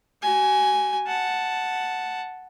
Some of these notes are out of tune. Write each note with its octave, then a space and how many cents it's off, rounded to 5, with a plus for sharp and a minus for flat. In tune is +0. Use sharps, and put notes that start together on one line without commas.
F#4 +40 G#5 +0
F#5 +0 A5 +0